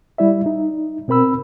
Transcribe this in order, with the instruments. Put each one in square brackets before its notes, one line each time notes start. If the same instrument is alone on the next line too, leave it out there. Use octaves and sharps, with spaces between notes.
[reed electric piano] G3 E4 D5 E5
D#4
B2 C4 A#4 B5 E6